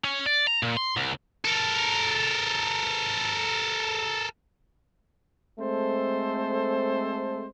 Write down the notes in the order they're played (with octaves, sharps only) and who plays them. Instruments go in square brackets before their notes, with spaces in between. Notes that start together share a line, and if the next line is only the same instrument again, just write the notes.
[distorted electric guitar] C#4
D5
A#5
A#2
C6
C2
A4 A#4
[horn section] G#3 A3 C4 A4 C5